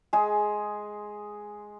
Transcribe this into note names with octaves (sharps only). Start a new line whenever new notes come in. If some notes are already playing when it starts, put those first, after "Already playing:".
G#3 G#4